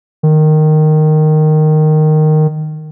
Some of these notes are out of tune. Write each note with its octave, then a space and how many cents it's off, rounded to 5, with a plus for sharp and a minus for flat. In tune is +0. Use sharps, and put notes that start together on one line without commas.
D#3 -10